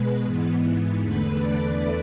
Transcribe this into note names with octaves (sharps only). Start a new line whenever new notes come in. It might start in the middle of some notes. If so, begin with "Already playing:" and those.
Already playing: B2 G#3 B4
G#2 E3 B3
E2 D3 A3 B4
D5